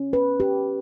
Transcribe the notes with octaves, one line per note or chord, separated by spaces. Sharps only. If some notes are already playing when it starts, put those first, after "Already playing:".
Already playing: C#4
B4
G4